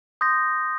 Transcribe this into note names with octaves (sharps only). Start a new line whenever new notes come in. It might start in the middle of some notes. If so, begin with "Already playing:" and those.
C6 D#6 G6 A#6